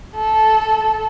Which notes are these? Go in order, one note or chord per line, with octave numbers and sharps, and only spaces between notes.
A4